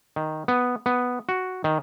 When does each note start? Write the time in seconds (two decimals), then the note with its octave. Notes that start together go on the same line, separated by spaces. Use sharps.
0.16 D#3
0.48 B3
0.86 B3
1.29 F#4
1.64 D#3